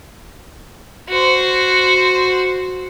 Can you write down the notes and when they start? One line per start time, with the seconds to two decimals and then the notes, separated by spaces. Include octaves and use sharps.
1.09 F#4 C5